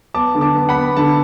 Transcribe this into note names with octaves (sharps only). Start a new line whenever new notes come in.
B3 A5 D6
D3
A5 D6
B3
F#5 B5
B3
D3 A5